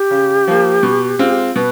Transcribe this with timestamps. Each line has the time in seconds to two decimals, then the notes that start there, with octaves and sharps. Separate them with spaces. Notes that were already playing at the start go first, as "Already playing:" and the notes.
Already playing: G4
0.11 C#3
0.47 F3 A#3
0.83 B2
1.19 G#3 C4 F4
1.56 B2 B4